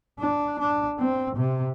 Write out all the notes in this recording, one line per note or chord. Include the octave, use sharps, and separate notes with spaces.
D4
D4
C4
C3